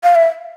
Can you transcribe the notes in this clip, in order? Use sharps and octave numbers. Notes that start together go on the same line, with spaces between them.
F5
E5